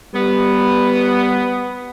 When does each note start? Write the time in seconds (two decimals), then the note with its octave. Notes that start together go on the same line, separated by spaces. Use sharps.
0.14 G3 B3